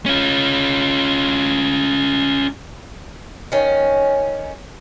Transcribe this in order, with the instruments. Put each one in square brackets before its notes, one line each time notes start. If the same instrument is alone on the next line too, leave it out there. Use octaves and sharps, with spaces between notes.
[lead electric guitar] C#4 F4
[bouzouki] D#3 C#4